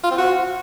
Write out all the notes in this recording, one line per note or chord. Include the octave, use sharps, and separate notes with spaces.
F4
C4
F#4